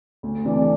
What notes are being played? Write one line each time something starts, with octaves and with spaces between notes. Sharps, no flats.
D2
C3 E3 A3 D4